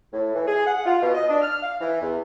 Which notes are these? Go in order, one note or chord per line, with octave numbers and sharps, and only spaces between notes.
A2
E3
G#4
F#5
F4
B2
D#5
D4
F6
F5
E3
E2